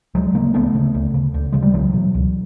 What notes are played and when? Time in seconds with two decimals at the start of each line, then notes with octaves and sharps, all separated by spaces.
0.15 D2 F#3 G#3
0.34 C#3 G#3 A#3
0.54 D2 A3 B3
0.75 C#3
0.94 D2
1.14 C#3
1.34 D2
1.52 C#3 G#3
1.63 G3
1.74 C#2 E3 F#3
1.93 B2
2.14 C#2